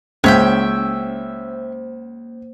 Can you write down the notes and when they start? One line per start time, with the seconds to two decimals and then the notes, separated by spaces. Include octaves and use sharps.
0.24 C#2 A#3 C5 C#5 E5 G5